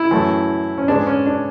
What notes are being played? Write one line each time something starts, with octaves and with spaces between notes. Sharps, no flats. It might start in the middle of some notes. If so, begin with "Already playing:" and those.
Already playing: E4
F#2 E3 A3
C#4
G#2 G#3 B3 D4
C#4
D4